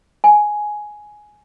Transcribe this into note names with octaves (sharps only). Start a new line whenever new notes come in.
G#5